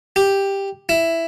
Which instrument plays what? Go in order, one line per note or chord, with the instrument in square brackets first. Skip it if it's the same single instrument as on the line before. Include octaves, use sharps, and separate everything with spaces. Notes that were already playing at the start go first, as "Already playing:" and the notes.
[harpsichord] G4
E4